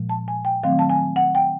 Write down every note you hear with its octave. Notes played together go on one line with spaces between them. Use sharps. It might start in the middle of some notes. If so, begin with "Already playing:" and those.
Already playing: A#2 F3 G#3
A5
G#5
G5
D#3 F#3 A3 C4 F5
A5
G#5
F#5
G5